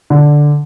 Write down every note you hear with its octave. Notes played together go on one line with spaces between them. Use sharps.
D3